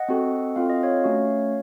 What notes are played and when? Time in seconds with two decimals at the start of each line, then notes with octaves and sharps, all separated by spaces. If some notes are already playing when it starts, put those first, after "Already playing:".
Already playing: D#5 F#5
0.09 C4 F#4 A4
0.56 C4 F4 A4 F5
0.70 D#5
0.83 C#5 F5
1.04 A3 C#4 F#4